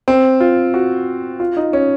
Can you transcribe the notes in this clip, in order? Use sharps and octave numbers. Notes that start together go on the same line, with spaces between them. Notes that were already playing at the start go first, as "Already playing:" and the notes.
C4
F4
F#4
F4
D#4
C#4